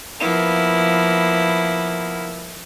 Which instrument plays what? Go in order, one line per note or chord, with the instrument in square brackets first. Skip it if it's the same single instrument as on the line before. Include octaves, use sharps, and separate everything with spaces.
[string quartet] F3 A#3 B3 E4